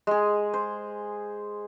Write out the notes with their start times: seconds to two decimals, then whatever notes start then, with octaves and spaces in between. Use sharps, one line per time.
0.07 G#3 G#4
0.54 C5